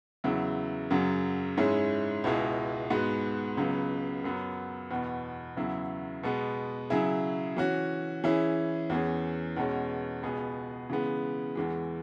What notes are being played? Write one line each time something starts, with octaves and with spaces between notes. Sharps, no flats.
E2 C#3 F#3 E4
F#2 C#3 F#3
G#2 G#3 C#4 E4 G#4
C#2 B2 G#3 E4 G#4
G#2 G#3 B3 F#4
C#2 C#3 F#3 B3
F#2 F#3 B3
E2 B2 B3
E2 C#3 F#3 E4 G#4
B2 G#3 B3
C#3 F#3 E4 G#4
E3 C#4 F#4
E3 C#4 E4 G#4
E2 E3 C#4 G#4
E2 B2 G#3 C#4
C#2 B2 B3 G#4
C#3 E3 G#3 B3
E2 E3 G#3